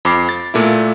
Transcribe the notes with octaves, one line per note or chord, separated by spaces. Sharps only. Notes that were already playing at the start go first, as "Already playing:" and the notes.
F2 D6 C7
A6
A#2 A3 A#3 E4